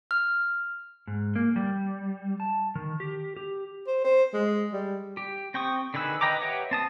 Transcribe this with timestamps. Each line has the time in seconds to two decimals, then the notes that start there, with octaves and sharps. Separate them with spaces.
0.11 F6
1.07 G#2
1.36 A#3
1.56 G3
2.40 A5
2.75 D#3
3.00 G4
3.37 G4
3.87 C5
4.04 C5
4.34 G#3
4.73 G3
5.17 G4
5.54 C4 G5 C#6 D#6
5.94 D3 D#3 G#4 B4 E6
6.21 B4 D#5 G5 A#5 D6
6.42 G4 B4 C#5 E5 F#5
6.71 C4 A5 D#6